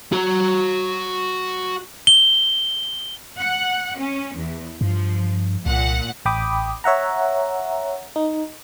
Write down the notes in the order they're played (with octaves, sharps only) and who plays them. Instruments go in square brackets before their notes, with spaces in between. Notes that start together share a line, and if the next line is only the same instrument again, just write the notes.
[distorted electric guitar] F#4 A#5
[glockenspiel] G7
[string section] F#5
C#4
E2
[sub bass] G2 [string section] F3
[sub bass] C2 [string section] A#2 F#5
[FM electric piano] A1 G5 B5 D6 D#6
C#5 E5 F#5 A#5
D#4